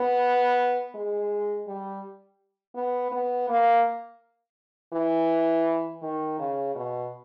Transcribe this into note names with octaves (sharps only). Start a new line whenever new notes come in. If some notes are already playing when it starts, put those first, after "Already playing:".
Already playing: B3
G#3
G3
B3
B3
A#3
E3
D#3
C#3
B2